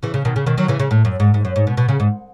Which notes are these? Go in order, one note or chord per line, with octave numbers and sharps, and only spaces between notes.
C#3 E3
C#3
B2 D#3
C#3
B2 D#3
D#3 F#3
C#3 E3
C#3
A2
F#2
G#2
G#2
F#2
G#2
B2
B2
C#3
G#2